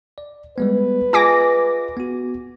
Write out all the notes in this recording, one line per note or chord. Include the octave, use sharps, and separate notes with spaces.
D5
G3 G#3 B3 B4
F4 G#4 D#5 G#5 D6 A#6
B3 F#4